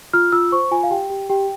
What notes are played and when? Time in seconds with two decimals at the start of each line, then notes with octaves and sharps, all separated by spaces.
0.13 F4 F6
0.32 F4 E6
0.52 C5 C#6
0.71 F4 G#5
0.83 F5
0.91 G4 G5
1.10 G4
1.30 G4 G5